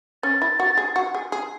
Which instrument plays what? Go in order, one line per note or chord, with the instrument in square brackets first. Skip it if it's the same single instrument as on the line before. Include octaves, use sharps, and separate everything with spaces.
[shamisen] C#4 [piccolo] A6
[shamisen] E4
F#4
G#4
F#4
G#4
G#4